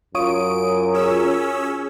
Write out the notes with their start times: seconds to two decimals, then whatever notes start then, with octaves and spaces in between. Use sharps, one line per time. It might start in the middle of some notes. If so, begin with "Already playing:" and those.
0.15 F#2 F4 C#5 D#6 D7
0.94 C#4 G#4 E6